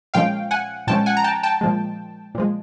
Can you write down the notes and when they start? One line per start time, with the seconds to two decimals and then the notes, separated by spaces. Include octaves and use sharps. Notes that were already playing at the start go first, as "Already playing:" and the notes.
0.14 A#2 F3 G#3 C#4 F5 G5
0.51 F#5 G#5
0.87 A#2 F3 G#3 C#4 G5 A5
1.06 F#5 G#5
1.17 A#5
1.24 G5 A5
1.43 G5 A5
1.61 A#2 F3 G#3
2.35 A#2 F3 G#3